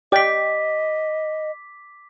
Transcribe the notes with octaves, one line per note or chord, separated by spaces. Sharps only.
G4 D5 D#5 G5 D6 B6